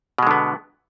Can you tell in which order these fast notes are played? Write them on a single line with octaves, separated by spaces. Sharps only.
B2 G#3 D3 B3